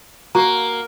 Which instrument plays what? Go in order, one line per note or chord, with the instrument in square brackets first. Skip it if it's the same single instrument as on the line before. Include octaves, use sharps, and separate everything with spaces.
[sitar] A#3 [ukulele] F#4 [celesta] A#5